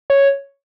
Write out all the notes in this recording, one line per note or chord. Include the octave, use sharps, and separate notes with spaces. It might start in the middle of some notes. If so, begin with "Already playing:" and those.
C#5